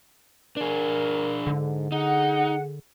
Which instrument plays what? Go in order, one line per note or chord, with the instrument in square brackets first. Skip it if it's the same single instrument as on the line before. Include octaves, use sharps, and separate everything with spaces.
[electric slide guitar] D4 G#4 [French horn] A#4
[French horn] G#2 [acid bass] D3
[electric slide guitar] D#4 [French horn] G#4 [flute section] F#5